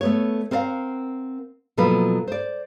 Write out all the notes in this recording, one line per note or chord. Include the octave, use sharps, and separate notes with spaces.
A3 B3 C#5
C4 A#4 B4 D5 F5 F#5
B2 F3 F#3 A#3 A4 B4
C5 D5